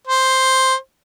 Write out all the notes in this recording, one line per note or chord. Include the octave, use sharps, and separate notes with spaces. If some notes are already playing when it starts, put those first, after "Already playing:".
C5